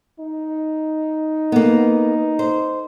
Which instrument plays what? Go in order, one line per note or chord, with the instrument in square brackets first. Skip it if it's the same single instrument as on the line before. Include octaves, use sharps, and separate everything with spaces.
[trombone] D#4
[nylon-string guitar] A#3 B3
C5